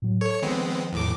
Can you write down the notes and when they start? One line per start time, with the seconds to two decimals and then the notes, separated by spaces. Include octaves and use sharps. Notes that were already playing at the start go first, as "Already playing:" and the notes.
0.02 A2 F#3
0.21 A4 C#5
0.42 D#3 F3 G#3 B3 C4
0.92 E2 A2 D6